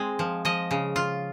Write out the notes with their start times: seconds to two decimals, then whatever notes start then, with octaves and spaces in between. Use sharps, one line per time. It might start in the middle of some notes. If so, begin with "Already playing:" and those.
Already playing: G#3 C4
0.19 F3
0.45 F3 D#5
0.71 C#3
0.96 F4